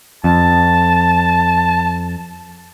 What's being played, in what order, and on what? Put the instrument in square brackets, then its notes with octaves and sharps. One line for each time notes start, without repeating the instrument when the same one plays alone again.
[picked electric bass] F2 [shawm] A5